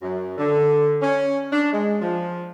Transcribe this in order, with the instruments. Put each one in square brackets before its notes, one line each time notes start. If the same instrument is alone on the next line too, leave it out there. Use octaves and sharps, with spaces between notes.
[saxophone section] F#2
D3
C#4
D4
G#3
F3